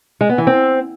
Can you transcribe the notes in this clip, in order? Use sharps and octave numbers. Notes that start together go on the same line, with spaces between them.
G#3
B3
E3
C4